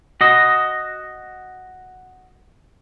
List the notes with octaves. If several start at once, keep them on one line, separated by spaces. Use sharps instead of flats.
F#4 D#5